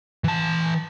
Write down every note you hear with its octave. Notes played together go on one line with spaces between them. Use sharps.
E3 A5